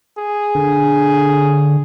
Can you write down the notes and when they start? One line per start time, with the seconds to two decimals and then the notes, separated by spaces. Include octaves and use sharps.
0.17 G#4
0.55 D3